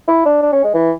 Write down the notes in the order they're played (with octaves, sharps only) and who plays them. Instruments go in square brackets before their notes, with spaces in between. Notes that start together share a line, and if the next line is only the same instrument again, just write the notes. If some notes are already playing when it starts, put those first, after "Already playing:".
[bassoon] E4
D4
D4
C#4
G#3
E3